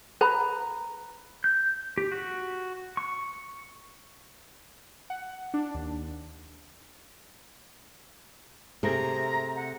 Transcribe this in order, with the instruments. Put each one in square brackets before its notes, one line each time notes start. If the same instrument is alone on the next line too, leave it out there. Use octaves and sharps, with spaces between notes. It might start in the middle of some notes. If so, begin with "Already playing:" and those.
[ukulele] B4 A#5
[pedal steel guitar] G6
G4
F#4
C#6
[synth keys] F#5
D4
D#2
[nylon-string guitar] C3 A3 G#4 [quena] A#5
[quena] F#5